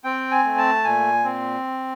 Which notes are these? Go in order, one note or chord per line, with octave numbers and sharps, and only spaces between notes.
C4 G5
G#5
A3
A5
A#2 G#5
C4